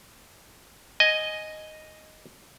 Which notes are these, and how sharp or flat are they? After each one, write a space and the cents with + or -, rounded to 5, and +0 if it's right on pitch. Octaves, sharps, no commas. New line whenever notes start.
D#5 +0 G#5 +5